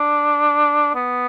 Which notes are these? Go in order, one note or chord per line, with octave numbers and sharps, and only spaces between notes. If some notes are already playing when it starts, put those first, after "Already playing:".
Already playing: D4
B3